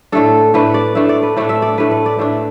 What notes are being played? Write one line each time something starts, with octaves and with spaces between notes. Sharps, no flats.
A2 A3 D4 A4
A2 A3 D4 B4
D5
A2 A3 D4 E5
D5
B4
A2 A3 D4 D5
E5
D5
A2 A3 D4 B4
B4
D5
A2 A3 D4 E5